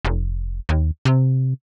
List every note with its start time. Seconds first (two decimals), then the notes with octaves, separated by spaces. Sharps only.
0.05 F1
0.69 D#2
1.05 C3